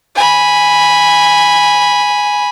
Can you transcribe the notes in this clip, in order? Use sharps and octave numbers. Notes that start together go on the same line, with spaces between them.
G#5 B5